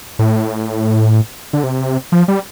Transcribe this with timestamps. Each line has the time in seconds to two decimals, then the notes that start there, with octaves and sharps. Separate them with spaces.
0.19 A2
1.53 D3
1.63 C3
2.12 F3
2.28 G3